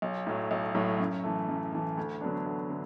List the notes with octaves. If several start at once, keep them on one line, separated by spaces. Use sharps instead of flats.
B1
A2 F#3
B1
A2 F#3
F#2
E3 A3
F#2
E3 A3
D2
D3 F#3 B3 D4
D2
D3